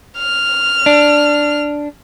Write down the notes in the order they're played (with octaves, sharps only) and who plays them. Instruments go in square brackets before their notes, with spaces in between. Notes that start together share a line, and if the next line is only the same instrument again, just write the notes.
[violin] F6
[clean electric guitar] D4